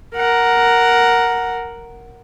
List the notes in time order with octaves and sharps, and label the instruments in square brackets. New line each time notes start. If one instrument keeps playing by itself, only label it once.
[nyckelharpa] A#4 F#5